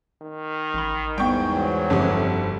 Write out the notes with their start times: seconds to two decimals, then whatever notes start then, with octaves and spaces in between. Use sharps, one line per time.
0.22 D#3
0.74 A1 B5
1.18 E2 G#2 G3 B3 G5 C#6
1.54 F#3
1.90 G1 F2 D3 F3 G4